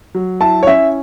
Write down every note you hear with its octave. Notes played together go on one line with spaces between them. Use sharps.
F#3
E4 A5
C#5
C#4 E5